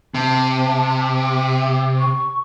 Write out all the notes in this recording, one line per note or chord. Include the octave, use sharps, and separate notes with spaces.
C3 A5
E5
C#6